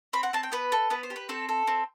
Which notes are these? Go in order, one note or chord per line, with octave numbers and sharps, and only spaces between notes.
C4 B5
F#5
C4 A5
G5
B3 B4
A4
B3 B4
C5
G4
B4
C4 A4
A4
C4